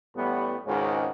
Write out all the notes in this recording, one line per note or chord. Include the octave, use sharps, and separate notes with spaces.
A1 A2 G3 B3
G#1 C#2 G#2 D#3 C#4 F#4